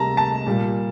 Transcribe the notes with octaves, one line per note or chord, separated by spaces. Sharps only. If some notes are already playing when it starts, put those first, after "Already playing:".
Already playing: C3 G3 A#3 A5 A#5
A5
A#2 G3 A#3